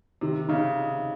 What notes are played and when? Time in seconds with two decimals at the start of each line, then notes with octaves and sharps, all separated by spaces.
0.21 C3 D#3
0.49 C#3 D#4